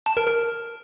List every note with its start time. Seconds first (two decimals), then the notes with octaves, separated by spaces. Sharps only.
0.06 A5
0.17 A#4
0.27 A#4